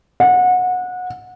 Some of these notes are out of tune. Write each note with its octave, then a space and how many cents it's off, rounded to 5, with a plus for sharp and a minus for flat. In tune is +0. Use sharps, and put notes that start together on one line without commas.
F#5 -25